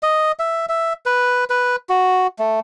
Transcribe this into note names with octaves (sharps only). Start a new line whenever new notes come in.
D#5
E5
E5
B4
B4
F#4
A3